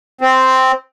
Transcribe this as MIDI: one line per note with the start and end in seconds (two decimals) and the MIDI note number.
0.21 0.72 60